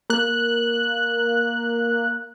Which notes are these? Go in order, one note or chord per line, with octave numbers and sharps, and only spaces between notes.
A#3 F#6